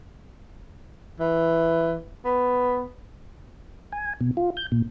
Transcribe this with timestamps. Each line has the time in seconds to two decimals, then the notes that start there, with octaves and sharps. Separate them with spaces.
1.20 E3
2.25 B3
3.92 G#5
4.21 B2
4.37 F4
4.57 G6
4.72 A#2